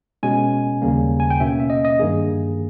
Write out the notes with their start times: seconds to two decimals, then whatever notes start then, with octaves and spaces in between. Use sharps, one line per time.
0.23 B2 G#3 C#4 G#5
0.82 D#2 C#3 G3 A#3
1.20 G#5
1.30 G5
1.40 B2 A#3 C#4 E5
1.60 E5
1.70 D#5
1.85 D#5
2.00 G2 D#3 A#3 G#4